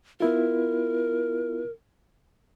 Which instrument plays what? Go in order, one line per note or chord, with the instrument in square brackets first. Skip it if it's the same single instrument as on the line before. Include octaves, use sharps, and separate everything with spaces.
[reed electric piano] B3 E4 F4 [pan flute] A#4